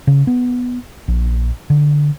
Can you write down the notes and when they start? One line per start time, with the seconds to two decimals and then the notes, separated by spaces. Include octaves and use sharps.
0.07 C#3
0.27 B3
1.08 A#1
1.70 D3